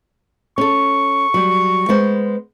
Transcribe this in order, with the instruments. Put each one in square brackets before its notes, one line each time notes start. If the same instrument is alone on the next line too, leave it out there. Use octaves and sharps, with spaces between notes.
[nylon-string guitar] C#4 A4 [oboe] C#6
[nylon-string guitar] F#3 G3
G#3 B3 C5